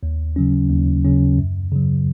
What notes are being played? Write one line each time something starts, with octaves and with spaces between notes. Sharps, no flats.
D#2
C#3 F#3 C#4
D#2
C#3 F#3 C#4
F#2
C#3 F#3